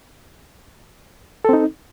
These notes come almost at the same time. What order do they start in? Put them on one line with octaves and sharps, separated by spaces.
A4 C4 D#4